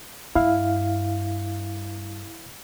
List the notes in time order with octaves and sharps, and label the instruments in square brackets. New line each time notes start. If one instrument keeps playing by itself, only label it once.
[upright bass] G2 [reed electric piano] E4 F5